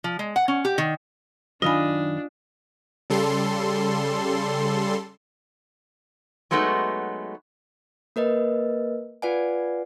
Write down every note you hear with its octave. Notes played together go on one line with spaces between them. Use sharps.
F3
G#3
F#5
C#4
G4
D#3
F#2 D#3 D4 F4 D#5 F5 G#5 B5
C#3 G3 A4 C6
F#3 G#3 A3 B3 D#4
A#3 A#4 B4 D#5
F4 B4 D5 F#5 G#5